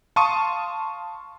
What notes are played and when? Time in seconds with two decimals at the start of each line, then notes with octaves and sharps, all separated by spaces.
0.16 F5 A5 C6 C#6 D#6 D#7